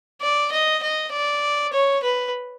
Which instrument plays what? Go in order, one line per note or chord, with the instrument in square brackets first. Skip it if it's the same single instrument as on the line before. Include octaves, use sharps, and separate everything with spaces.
[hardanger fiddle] D5
D#5
D#5
D5
C#5
B4